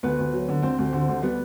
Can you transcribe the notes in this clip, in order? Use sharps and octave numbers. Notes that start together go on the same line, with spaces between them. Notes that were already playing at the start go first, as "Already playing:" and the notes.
D2 B3 B4
D2
F#3
D3
D2 C4 C5
D2
D3
D2
G3 B3 B4